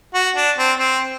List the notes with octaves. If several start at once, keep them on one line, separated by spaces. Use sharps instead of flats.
F#4
D4
C4
C4